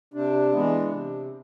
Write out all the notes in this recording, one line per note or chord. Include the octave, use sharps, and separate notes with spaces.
C3 D4
E3 G#3 B3
C3